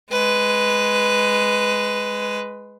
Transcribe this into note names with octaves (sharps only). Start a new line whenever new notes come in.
G#3 B4